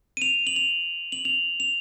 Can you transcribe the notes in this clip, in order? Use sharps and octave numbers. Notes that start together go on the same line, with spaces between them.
D#7
F7
F#7
F7
F#7
F7
F7